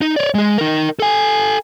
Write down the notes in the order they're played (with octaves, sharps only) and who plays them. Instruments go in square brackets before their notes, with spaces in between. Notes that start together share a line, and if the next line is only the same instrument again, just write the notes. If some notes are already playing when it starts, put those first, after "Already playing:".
[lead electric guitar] D#4
C#5 D5
G#3 G#4
D#4 A#4
A4 G#5